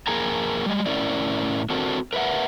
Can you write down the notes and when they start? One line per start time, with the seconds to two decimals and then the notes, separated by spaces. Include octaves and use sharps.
0.07 F2 A#3 G#4 A#4 G#5 A#5
0.66 G3 G#3
0.86 A2 C#4 E4 A#4 D5
1.70 C4 D4 F#4 A4 A#4
2.13 A#4 B4 D#5 E5 F#5